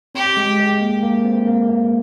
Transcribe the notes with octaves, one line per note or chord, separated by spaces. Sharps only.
C4 G4
G#3
G#3
A#3
A#3
C4
A#3
A#3